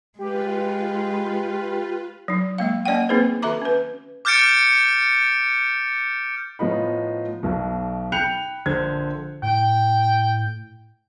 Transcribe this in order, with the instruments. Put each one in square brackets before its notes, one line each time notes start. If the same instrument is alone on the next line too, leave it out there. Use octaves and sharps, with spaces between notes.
[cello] G#3 [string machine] F4 B4 [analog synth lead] G4
[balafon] F#3 D#4
G#3 A#3 F5
A#3 C#4 D5 D#5 F#5 G5
A#3 C4 D#4 G#4 B4 C5
D#3 F#4 A4 E5 A#5 D6
C#4 B4
[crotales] D6 F6 G6 A6 C#7 D7
[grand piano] A2 F3 B3 D#4 B5
B1 B2
G5 B5 F#6 G6 C#7 F7
A#1 D3 C5 G#6
[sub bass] A2 [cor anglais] G5